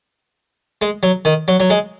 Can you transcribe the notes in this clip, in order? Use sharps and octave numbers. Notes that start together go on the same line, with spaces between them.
G#3
F#3
D#3
F#3
F#3
G#3